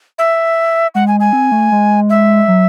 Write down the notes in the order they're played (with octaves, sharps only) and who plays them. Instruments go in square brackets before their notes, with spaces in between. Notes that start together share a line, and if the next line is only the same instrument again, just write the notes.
[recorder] E5
[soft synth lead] G#3 [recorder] F#5
[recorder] G#5
G#5
[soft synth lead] C4
A3
G#3
[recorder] E5
[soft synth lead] F#3